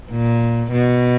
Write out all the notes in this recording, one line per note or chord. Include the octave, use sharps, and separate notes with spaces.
A#2
B2